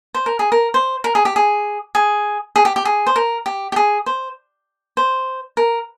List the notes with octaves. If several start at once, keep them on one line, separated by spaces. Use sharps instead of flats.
C5
A#4
G#4
A#4
C5
A#4
G#4
G4
G#4
G#4
G#4
G4
G4
G#4
C5
A#4
G4
G4
G#4
C5
C5
A#4